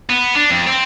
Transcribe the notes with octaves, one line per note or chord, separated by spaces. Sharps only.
B3
D4
F2
C4